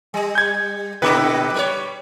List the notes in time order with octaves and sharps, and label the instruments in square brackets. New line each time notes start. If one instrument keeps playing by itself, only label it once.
[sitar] G3
[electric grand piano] G6 G#6
[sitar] A#2 D3 E4 [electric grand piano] B4 D6
[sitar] G3 A#4 C#5